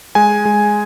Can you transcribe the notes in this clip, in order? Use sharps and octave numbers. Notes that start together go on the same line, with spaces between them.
G#3 G#5
G#3